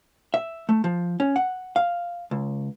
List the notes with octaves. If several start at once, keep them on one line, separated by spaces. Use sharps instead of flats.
E5
A3
F3
C#4
F#5
F5
C#2